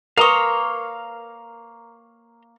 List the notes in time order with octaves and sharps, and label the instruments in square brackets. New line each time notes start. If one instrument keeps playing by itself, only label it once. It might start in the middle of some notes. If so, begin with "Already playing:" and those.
[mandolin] A#3 C#5 [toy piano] A#4 B4 D#6 [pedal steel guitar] F5 A#5 C6